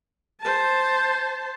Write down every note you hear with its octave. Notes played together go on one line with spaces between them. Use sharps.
C5 A5